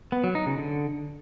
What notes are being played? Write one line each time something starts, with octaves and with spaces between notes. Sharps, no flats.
B3
F#3
D#4
C#3
D3